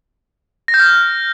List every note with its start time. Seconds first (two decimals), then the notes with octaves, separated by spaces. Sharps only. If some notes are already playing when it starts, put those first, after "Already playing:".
0.68 A#6
0.74 G6
0.80 F6